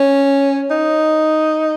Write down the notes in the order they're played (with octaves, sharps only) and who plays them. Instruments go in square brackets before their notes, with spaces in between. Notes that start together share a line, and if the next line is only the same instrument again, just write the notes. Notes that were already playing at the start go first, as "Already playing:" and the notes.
Already playing: [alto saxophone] C#4
D#4